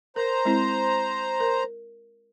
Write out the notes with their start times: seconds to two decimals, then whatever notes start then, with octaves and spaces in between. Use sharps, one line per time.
0.16 A#4 C5 A#5
0.45 G#3 C4 E4
1.40 A#4